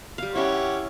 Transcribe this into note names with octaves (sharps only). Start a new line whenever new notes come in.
G3 F5
C#4 E4 G4 C#5 F#5